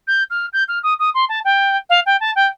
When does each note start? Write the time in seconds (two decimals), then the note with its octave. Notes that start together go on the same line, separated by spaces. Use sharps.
0.07 G6
0.30 F6
0.53 G6
0.68 F6
0.83 D#6
0.99 D#6
1.14 C6
1.29 A5
1.45 G5
1.90 F5
2.06 G5
2.20 A5
2.36 G5